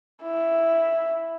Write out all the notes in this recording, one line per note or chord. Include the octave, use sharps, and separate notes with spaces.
E4